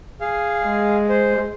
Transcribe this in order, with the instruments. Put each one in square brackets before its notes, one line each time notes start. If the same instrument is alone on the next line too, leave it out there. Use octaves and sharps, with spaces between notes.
[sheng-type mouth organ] G#4 F5
[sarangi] G#3
[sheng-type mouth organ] C5